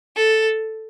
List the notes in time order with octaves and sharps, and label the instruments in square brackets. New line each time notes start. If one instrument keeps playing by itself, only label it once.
[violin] A4